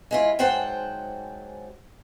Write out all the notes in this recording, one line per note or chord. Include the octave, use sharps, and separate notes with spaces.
G#3 E4 F4
G#2 F#3 C5 F#5 G5 A5